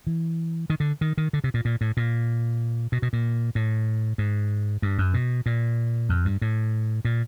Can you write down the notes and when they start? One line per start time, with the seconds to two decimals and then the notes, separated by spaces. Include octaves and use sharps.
0.07 E3
0.70 D#3
0.80 D3
1.01 D#3
1.18 D#3
1.33 D3
1.44 C3
1.54 A#2
1.65 A#2
1.81 A2
1.97 A#2
2.92 B2
3.02 B2
3.13 A#2
3.55 A2
4.18 G#2
4.82 G2
4.98 F#2
5.14 B2
5.46 A#2
6.09 F2
6.25 G2
6.42 A2
7.05 A#2